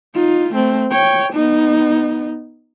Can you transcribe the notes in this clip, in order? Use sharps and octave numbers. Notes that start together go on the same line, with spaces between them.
D#4 F4
A3 C4
C#5 G5
B3 D#4